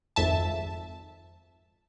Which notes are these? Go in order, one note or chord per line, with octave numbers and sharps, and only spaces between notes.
G#1 F2 E5 A5